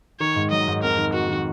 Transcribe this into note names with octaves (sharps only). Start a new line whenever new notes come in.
D#3 C#5
G#2
F#3 D#5
G#2
F2 A#4
D#3
A#3 F#4
D#3